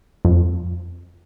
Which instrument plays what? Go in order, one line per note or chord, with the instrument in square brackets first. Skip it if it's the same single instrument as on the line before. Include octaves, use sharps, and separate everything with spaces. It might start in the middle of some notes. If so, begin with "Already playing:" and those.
[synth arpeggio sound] F2